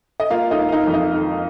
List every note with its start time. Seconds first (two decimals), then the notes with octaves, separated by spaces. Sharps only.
0.20 D#5
0.31 A#3 F4 F5
0.51 D#4 D#5
0.58 A#3
0.69 F5
0.72 D#4 D#5
0.87 F2
0.93 D#4 D#5
1.14 D#3